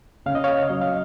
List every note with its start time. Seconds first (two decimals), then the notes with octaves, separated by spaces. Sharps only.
0.26 C#3 F5
0.35 D#5
0.44 C#5 F5
0.69 F#3 D#5
0.81 F5